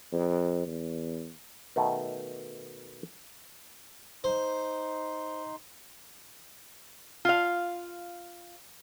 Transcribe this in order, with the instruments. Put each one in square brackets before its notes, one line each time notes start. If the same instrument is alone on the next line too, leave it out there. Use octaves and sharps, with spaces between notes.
[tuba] F2
E2
[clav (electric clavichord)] B2 D#3 A3
[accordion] D#4 C6 [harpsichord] C5
[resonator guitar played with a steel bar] F4 F5